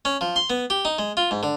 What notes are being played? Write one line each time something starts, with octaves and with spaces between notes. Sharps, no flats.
C#4
F3
C6
B3
G4
D#4
G#3
F4
G#2
D3